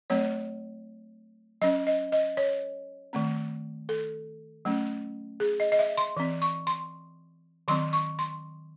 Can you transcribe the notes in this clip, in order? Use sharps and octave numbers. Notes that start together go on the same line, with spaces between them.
F#3 A3 C4 C#5
F#3 C#4 D#5
D#5
D#5
C#5
D#3 A3 C4
A4
F#3 A3 C#4
G#4
D#5
D#5
E5
C6
E3 C4
C#6
C6
D#3 F#3 C4 C6
C#6
C6